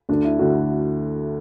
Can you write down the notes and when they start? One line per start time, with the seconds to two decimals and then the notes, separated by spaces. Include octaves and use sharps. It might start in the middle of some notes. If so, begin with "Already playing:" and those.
0.09 D2 D3 D4
0.24 E4
0.39 D2 D3 F#4